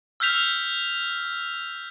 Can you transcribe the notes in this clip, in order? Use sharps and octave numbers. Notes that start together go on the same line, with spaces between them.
E6 F6 G6 B6 F7